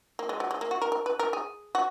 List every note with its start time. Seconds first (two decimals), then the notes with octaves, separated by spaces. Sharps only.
0.19 A#3
0.29 G#3
0.40 F#3
0.51 G#3
0.61 A#3
0.71 F#4
0.82 A#4
0.92 A#4
1.06 B4
1.19 A#4
1.33 G#4
1.75 F#4